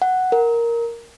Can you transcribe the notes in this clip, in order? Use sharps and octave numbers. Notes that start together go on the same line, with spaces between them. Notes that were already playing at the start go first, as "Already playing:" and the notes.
F#5
A#4